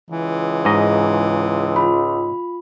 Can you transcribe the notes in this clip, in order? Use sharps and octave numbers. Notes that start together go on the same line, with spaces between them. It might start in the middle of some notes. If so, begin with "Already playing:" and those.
C#2 E3
G#2 D#5
F4 B5